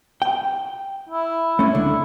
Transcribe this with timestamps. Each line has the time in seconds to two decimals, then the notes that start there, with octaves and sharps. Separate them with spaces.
0.22 G5
1.09 E4
1.59 A3 C#4 E4
1.75 C#2 D3